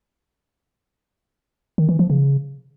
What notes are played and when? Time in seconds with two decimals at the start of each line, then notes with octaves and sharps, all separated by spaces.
1.78 D#3
1.89 E3
1.99 F3
2.10 C#3